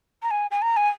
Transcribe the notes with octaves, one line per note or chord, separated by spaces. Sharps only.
A#5
G#5
G#5
A#5
G#5